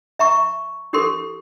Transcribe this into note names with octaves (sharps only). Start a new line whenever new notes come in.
E5 A#5 C#6
E4 G4 A4 A#4 C6